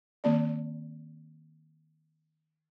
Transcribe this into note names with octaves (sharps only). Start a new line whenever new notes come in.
D#3 A#3 C4 D5